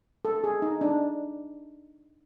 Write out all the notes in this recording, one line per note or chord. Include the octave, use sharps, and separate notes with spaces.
A4
G#4
D#4
D4